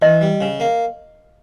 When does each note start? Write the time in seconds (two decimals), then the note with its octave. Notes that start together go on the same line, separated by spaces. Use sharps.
0.02 E3 D#5
0.21 G3
0.41 C#3
0.60 A#3